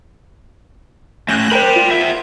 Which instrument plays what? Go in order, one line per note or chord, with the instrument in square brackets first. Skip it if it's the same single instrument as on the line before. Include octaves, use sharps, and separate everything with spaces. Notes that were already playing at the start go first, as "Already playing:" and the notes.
[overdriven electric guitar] A3 C#4 [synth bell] F#6 G6 A#6
[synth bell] A#4 C5 [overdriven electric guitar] G5 B5
[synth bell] F4
[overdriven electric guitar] B3 E5